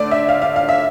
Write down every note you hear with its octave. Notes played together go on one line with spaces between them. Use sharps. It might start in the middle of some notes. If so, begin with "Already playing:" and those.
Already playing: D3 A3 D5
E5
F5
F5
F5
E5